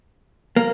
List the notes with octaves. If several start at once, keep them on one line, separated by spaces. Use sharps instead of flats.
A#3